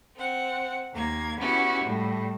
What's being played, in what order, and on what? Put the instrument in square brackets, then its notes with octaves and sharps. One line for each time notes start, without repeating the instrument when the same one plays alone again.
[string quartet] C4 F#5
D#2 A#3 G#6
B3 C#4 E4 F#4 G4
A2 G3